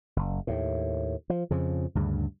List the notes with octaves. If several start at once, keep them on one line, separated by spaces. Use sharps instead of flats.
F#1
D#2 A2
F3
F2 C#3 F3
D2 G2 C#3